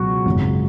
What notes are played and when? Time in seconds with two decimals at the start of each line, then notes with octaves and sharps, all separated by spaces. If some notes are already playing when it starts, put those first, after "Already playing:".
Already playing: C#2 B2 F#3 F#4
0.26 G#1 F#2 C#3